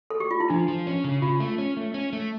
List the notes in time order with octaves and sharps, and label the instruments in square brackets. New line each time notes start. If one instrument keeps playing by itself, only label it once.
[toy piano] A4
G4
F4
E4
[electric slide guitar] F3 [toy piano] D4
[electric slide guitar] F3
C#4
C#3
[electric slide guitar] C#3 [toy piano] F4
[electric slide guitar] A3
C#4
A3
C#4
A3